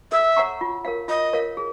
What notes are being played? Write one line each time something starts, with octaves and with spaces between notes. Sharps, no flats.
A4 E5
C#5 F#5 A#5 C#6
F4
A#4 C#5 F5
F4 D#5
A#4 C#5 F5
G#4